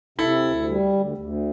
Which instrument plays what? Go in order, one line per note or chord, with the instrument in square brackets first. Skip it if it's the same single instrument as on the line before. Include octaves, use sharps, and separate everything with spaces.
[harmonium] C3 [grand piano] E4 A4
[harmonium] D2
G3
D2
D2